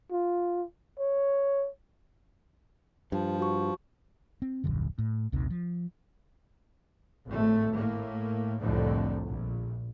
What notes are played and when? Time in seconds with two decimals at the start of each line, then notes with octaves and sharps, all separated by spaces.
0.11 F4
0.99 C#5
3.12 G2 F3
3.39 F#4 C#6
4.42 C4
4.64 D#1 A#1 F#2 D3
4.98 A2
5.32 A#1 D#2 C3 D#3
5.50 F3
7.27 G#1 A2 A3
7.74 A2 A#3
8.59 C2 F2 A2 D3
9.28 A#1